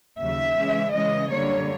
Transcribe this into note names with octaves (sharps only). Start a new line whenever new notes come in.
D#2 C#3 F#3 E5
C#3 E3 G#3 C#4
C#3 E3 G#3 C#4 D#5
F#2 D3 G3 A#3 C#5